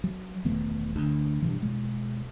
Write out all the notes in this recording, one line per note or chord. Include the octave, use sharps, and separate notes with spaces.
F#3
E1 D#3 A3 B3
D2 D3
G2 B2 E3
B2 G#3